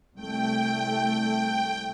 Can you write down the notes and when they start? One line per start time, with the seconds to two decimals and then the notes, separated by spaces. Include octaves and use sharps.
0.15 C2 A3 G5